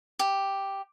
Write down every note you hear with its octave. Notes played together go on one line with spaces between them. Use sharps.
G4